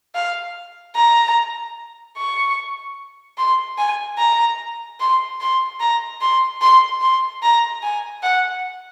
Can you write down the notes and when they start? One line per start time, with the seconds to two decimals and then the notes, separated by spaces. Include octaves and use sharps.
0.15 F5
0.95 A#5
2.17 C#6
3.38 C6
3.78 G#5
4.18 A#5
5.00 C6
5.41 C6
5.80 A#5
6.21 C6
6.61 C6
7.01 C6
7.43 A#5
7.83 G#5
8.23 F#5